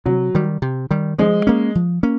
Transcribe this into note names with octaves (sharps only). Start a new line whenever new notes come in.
C3 F#3
D#3 G3
C3
D#3 G3
F3 G#3
A#3 C#4
F3
A#3 C#4